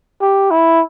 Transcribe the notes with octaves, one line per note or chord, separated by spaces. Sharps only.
G4
E4